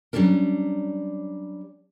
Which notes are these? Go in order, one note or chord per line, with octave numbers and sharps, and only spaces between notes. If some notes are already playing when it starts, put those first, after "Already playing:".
F#3 G3 A#3 C#4 D4 A#4